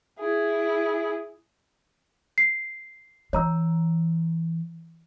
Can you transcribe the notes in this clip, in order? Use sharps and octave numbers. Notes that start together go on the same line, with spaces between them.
E4 G#4
C7
E3 C#5 A#5 E6